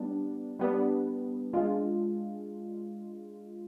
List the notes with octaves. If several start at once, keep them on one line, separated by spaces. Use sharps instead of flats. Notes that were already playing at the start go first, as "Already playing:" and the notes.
Already playing: G3 B3 D4
G3 B3 D4
G#3 D4 F4